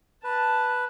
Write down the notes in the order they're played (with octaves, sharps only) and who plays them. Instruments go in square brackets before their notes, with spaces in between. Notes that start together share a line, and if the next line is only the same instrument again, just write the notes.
[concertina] B4 [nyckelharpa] A5